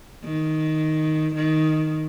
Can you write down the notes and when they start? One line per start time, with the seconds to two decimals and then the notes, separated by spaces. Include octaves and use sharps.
0.25 D#3
1.36 D#3